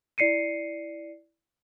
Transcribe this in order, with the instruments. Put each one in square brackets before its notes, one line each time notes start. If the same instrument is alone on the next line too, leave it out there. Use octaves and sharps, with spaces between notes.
[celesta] E4 D5 C7 C#7 D#7